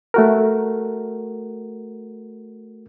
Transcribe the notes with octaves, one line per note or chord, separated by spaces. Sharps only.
A3 F#4 A#4